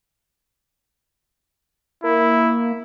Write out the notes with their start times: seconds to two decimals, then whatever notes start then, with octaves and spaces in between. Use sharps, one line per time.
2.04 A#3 E4